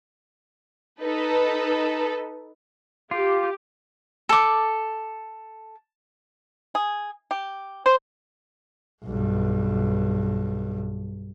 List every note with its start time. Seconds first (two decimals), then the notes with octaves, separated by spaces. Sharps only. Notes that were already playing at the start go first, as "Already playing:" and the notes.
1.01 D#4 A4 B4
3.11 F4 G4
4.29 A4 D6
6.75 G#4
7.31 G4
7.86 C5
9.04 B1 G2